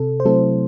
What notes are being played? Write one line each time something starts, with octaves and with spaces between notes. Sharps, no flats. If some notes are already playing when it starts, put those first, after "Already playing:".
Already playing: C3 A4
C5
F#3 A3 C4 E4 A4